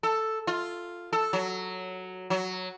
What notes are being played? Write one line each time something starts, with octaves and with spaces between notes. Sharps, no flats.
A4
F4
A4
F#3
F#3